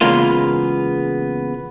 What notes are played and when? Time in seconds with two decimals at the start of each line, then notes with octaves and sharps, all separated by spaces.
0.01 C#3 E3 G#3 A#3 B3 F4